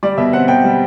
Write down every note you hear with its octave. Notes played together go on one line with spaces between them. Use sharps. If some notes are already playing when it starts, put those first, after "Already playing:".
G3 D5
B2 E5
C4 F#5
B2 G5
G3